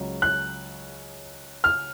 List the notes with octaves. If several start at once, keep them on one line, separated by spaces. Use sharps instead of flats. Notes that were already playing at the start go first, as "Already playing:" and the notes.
Already playing: C#2 C#3 F#3
F#6
F6